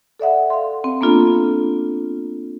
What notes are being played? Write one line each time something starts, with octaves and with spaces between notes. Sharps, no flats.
A4 D5 E5 F#5
F5 C6
C4
A#3 B3 D4 F4 A4